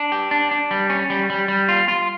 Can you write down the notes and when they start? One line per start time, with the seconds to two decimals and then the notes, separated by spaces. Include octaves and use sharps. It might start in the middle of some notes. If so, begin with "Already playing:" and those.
Already playing: D4
0.12 G4
0.31 D4
0.51 D4
0.71 G3
0.90 C#4
1.10 G3
1.30 G3
1.48 G3
1.69 F4
1.88 F4